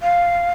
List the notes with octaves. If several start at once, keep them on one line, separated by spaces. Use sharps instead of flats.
F5